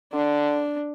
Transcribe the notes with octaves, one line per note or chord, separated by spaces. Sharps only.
D3 D4